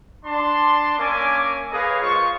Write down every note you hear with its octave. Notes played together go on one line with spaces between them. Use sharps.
D4 A5 C6
A#3 C#4 E5 G#5 D6
G#4 A#4 B4 C#5 D#5 F5
G#3 F4 C5 C#6